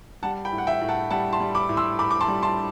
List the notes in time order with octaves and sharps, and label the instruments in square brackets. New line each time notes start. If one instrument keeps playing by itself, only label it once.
[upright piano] G3 F#5 A5
G5 B5
A2
F#5
E5 G5
A2
F#5 A5
G3 F#5 A5
A5 C6
G3
B5 D6
A2
C6 E6
A2 B5 D6
D6
A5 C6
G3
A5 C6